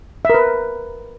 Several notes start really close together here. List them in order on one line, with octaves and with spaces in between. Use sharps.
E5 A#4 B4